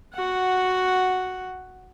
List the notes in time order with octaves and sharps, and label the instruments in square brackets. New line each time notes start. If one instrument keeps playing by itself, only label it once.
[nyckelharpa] F#4 F#5